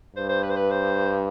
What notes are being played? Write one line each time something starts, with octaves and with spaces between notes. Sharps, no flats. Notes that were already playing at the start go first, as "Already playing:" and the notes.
G2 C5
C5
B4
C5
B4
C5